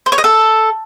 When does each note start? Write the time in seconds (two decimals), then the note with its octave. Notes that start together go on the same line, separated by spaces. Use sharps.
0.06 C5
0.12 C#5
0.18 D#5
0.24 A4